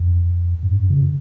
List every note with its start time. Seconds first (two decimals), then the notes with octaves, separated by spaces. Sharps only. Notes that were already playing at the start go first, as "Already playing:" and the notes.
Already playing: F2
0.63 G#2
0.74 F#2
0.90 C#3